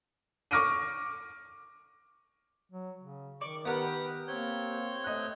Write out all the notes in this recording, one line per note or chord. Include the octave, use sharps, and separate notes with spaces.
C#6 D6 F6 A#6 D7 D#7
F#3
C#3
D#3 D5 C#6 D6
B3 G4 A#4 B4 F#5 D#6
A#3 C4 C#5 G6
A3 D#5 F#6